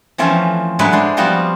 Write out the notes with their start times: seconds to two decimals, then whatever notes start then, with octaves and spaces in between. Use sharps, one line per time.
0.18 E3 F3 A3 C4 C#4 F4
0.79 A2 D3 F#3 G#3 E4 B4
0.92 G#3 D4 C5
1.17 F3 G3 B3 C4 F4 F#4